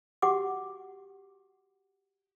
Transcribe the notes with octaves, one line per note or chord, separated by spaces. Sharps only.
F#4 G4 F#5 D6